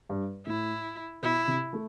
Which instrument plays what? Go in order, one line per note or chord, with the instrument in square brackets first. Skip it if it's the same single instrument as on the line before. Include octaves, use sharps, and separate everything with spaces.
[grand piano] G2
[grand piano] A2 [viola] E4
[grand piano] B2 [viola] E4
[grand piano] C3
A3